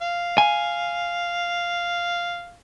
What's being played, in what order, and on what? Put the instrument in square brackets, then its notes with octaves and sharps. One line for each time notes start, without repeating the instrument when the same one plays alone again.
[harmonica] F5
[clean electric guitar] G#5